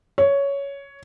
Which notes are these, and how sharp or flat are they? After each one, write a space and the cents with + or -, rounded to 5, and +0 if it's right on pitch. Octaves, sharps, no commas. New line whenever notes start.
C#5 +10